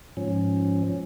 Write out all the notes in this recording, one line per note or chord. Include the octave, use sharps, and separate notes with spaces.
G#2 F3 C#4